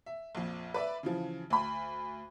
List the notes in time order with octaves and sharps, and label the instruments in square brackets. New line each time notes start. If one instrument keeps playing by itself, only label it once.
[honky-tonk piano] E5
A#1 F2
B4 D5 E5
C#3 E3 F3
D2 B5